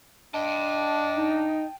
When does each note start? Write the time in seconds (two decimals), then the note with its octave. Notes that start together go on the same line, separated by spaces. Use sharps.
0.34 D4 D#5 G5 A5
1.17 D#4